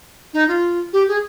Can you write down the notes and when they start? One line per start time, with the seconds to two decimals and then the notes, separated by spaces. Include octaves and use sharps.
0.34 D#4
0.48 F4
0.93 G4
1.08 G#4